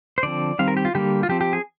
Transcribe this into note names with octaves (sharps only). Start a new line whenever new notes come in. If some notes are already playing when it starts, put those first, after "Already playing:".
C5
D3 F3 C4 D5
D#3 G3 C4 F5
A#4
G4
F4
D3 G3 A#3 G4
F4
F3 C4 G4
G4
G#4